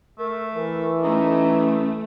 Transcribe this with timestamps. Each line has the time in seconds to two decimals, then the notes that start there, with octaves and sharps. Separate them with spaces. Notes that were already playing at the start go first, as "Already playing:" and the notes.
0.19 A3 A#4
0.55 E3 A#4
1.03 A3 C#4 D#4